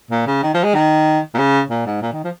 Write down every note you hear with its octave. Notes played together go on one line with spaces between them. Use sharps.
A#2
C#3
D#3
F3
G#3
D#3
A#2
C#3
A#2
G#2
A#2
D#3
F3